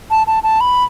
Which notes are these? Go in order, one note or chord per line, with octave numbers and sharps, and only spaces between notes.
A5
A5
A5
B5